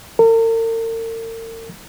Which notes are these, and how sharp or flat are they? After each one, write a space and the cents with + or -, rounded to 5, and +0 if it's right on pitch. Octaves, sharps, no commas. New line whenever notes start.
A#4 -45